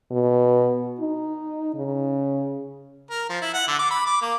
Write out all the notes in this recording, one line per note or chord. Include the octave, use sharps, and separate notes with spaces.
B2
D#4
C#3
A#4
F3
E4
F#5
D3
D6
B5
D6
A#3